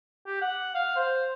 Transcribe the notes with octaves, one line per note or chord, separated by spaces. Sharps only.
G4
F#5
F5
C5